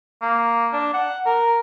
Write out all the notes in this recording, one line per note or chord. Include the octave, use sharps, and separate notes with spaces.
A#3
D4
F#5
A#4